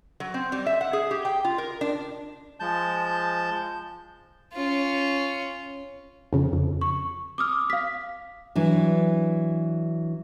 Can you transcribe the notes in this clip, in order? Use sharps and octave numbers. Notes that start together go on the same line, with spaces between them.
F#3
C4
G3
E5
F#5
G#4
G4
G5
F4
A#4
D4
F3 G#3 A5 G6
C#4 F4
F2 C#3
F2
C#6
D6 D#6 F6
F5 B6
E3 F#3 D4